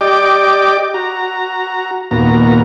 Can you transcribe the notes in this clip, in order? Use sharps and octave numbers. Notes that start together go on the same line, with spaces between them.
G4 D5 D#5 G5 D6
F#4 A#5
D#2 A#2 B3 F#4 A#5